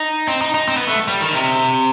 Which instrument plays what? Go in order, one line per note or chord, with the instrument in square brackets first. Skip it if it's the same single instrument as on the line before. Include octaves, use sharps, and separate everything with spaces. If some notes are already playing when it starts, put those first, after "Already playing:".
Already playing: [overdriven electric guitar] D#4
C4
D#4
D#4
C4
B3
A3
G3
D#3
C3